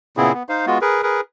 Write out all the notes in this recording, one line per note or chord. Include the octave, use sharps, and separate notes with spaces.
A#2 C#3 B3 C4 E4 G#4
B3
D#4 C5 F5
G#3 B3 F4 F#4
G#4 A#4 B4
G#4 A#4 B4